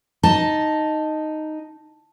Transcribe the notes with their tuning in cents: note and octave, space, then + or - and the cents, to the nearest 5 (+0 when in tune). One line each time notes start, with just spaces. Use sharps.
D#4 +0 A5 +0